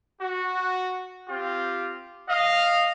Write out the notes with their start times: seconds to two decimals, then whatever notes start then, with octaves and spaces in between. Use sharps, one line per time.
0.21 F#4
1.28 C4 F4 G4
2.29 D#5 F5